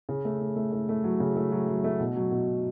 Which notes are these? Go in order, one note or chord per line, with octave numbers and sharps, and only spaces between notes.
C#3
A3
A3
A3
A3
A3
F#3
C#3
A3
F#3
F#3
A3
B2
F#3
B2